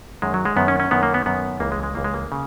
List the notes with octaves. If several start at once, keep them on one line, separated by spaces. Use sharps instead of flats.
F#2 D#3 G#3
F#3
G#3
F#2 D#3 B3
C#4
C#4
F#2 D#3 B3
A#3
B3
F#2 D#3 B3
C#2 C#3 E3 A#3
G#3
G#3
C#2 C#3 E3 A#3
G#3
A#3
C#3